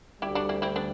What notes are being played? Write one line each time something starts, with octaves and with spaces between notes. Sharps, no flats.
D2 D3 G3 E4 G4
D4 F#4
C4 E4
C4 E4
B3 D4